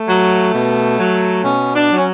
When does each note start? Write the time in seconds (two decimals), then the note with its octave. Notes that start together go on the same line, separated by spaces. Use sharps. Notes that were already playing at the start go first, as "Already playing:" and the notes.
Already playing: A3
0.08 F#3
0.54 B2
0.99 F#3
1.44 B2 C#4
1.75 D4
1.91 F#3
1.98 C#4